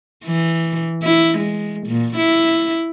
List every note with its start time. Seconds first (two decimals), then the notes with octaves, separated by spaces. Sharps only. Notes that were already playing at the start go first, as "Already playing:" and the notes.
0.25 E3
1.03 E4
1.38 G#3
1.87 A#2
2.16 E4